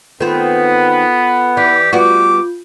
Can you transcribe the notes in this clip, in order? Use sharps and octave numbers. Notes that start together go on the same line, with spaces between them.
D#3 B3 C4 F4 A4 B4
E3 G4 D5
G3 B3 F4 F#4 D6 G6